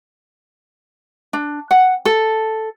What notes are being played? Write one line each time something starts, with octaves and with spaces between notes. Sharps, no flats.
D4
F#5
A4